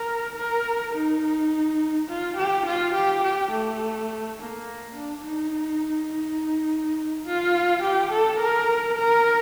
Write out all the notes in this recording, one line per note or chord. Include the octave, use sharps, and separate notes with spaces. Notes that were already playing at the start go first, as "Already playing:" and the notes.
Already playing: A#4
A#4
D#4
F4
G4
F4
G4
G4
A3
A#3
D4
D#4
D#4
F4
G4
A4
A#4
A#4